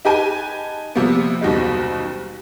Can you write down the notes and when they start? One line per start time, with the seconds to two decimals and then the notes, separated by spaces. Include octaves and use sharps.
0.05 D#4 G4 B4 G#5 A5
0.95 C3 F3 G3 A#3 B3
1.41 F#1 D#2 B2 G3 D#4